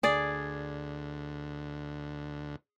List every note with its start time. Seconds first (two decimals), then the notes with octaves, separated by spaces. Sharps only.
0.03 D2 G#4 D5